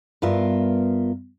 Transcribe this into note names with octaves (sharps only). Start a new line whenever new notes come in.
G2 B3 F4 A#4 E5